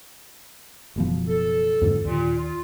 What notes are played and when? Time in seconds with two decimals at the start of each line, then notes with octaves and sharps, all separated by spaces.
0.96 F#1 B2 F3
1.28 A4
1.81 F2 G#2 D3
2.05 D#2 A#2
2.36 F4